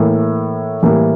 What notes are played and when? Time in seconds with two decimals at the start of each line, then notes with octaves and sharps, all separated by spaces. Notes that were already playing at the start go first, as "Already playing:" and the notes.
Already playing: A2 E3 A#3
0.83 A2 E3 G3 A#3